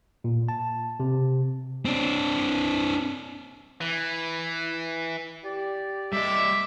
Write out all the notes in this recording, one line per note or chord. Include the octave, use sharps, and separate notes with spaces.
A#2
A5
C3
C4 D4
E3
G4 D5
G3 D#5 E5 D6